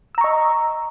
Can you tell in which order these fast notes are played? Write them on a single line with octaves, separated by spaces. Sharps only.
E6 A#5 C#6 D#5